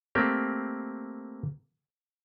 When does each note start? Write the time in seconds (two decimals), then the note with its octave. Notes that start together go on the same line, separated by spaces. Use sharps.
0.15 A3 A#3 C4 G4